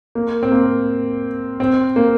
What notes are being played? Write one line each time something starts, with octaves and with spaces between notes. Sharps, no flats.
A#3
C4
A#3
C4
A#3